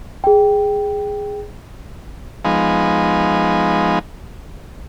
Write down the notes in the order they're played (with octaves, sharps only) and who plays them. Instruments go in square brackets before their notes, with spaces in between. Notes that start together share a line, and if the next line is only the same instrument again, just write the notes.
[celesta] G#4 G5
[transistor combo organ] F3 G#3 B3 D#4